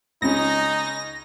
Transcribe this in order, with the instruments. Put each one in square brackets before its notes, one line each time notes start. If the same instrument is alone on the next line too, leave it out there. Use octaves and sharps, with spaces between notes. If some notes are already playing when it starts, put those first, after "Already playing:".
[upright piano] C#2 C#4 [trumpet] D#4 [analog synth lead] A#6